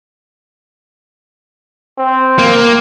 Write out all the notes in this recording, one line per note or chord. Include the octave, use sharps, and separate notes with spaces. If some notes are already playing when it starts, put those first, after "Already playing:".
C4
A#3